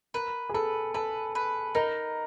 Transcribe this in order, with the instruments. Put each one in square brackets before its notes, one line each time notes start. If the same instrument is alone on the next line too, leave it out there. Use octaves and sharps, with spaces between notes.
[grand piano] A#4 [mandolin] B4
[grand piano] G#4
[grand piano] A4 [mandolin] B4
[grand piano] A4 [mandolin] B4
[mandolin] B4
[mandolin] D#4 [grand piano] A#4